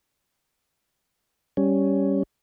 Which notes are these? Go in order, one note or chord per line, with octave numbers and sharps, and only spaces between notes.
G3 C#4